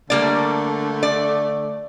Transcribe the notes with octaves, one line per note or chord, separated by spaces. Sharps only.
D3 G3 A3 A#3 D5
D5